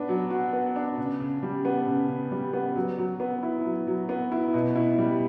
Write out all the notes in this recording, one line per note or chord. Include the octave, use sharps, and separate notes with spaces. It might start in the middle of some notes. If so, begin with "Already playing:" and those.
Already playing: B3 D4
F#3
F#4
B3
D4
C#3
C#3
G3
B3
C#3
C#3
G3
B3
F#3
F#3
B3
E4
F#3
F#3
B3
E4
B2
E4
G3